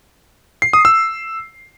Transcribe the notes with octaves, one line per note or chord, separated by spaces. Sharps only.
C7
D#6
E6